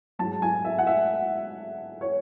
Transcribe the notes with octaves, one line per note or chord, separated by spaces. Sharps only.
G#2 F#3 A5
G#5
E5
F#5
E5
C#5